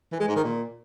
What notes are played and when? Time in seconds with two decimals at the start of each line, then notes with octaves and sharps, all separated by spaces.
0.12 E3
0.20 G#3
0.28 G#2
0.36 D#3
0.44 A#2